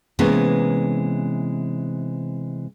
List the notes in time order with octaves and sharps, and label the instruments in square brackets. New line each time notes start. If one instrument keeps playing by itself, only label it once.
[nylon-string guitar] C3 E3 G#3 A#3 B3 C#4